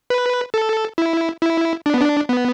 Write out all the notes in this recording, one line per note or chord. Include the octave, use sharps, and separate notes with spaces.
B4
A4
E4
E4
D4
B3
D4
B3